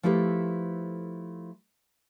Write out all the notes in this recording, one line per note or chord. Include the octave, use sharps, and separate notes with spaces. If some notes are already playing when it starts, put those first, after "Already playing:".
F3 A3 E4 G4 A4 B4